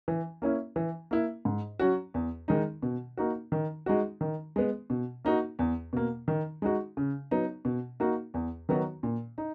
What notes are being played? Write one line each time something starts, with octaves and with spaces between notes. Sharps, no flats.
E3
A#3 C#4 E4
E3
A#3 E4
G#2
F#3 C#4 F#4
E2
D#3 G#3 D#4
B2
A#3 D#4 F#4
D#3
G#3 D#4 F#4
D#3
G#3 B3
B2
A#3 D#4 F#4
E2
B2 A#3
D#3
G#3 D#4 F#4
C#3
F#3 B3 D#4
B2
A#3 D#4 F#4
E2
D#3 F#3 B3 F#4
A#2
D#4